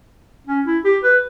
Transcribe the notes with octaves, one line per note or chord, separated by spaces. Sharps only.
C#4
E4
G4
B4